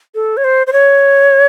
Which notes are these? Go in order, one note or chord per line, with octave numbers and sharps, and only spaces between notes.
A4
C#5
C5
C5
C#5